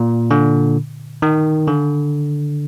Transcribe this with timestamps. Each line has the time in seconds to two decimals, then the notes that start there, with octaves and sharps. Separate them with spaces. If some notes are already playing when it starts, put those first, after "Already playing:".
Already playing: A#2
0.31 D3
1.22 D#3
1.68 D3